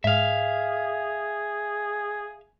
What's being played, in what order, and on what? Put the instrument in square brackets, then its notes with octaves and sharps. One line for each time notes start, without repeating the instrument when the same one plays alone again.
[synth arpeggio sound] G#2 [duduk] G#4 [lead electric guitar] E5 F5